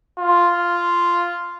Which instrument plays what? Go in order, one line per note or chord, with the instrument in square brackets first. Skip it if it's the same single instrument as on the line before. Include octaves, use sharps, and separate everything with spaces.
[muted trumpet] F4